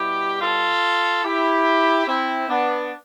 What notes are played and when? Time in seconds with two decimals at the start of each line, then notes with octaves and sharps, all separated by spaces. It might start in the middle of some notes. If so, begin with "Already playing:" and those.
Already playing: B2 G3 E4 G4
0.41 F4 A4
1.23 E4 G4
2.06 C4 E4
2.48 B3 D4